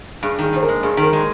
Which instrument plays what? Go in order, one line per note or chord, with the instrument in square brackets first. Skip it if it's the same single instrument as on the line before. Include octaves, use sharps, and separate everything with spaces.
[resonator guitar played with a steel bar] G2 [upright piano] G#4
[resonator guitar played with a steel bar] D#3 [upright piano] G#4
[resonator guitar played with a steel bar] G2 [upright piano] C5
[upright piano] A#4
[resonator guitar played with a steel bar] G#3
[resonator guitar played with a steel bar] G2 [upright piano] G#4
[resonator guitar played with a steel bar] D#3
[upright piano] A#4
[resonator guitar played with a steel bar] G#3